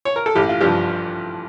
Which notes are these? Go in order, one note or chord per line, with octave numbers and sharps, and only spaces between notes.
C#5
A#4
A4
A1 G4
F4
G2 F3 G4